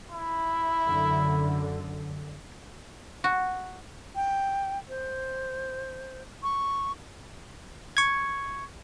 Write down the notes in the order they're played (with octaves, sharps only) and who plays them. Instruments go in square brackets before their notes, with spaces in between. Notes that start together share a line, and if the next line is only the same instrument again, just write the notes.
[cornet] E4
[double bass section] F#2 D3
[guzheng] F#4
[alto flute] G5
C5
C#6
[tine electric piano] C#6 G#6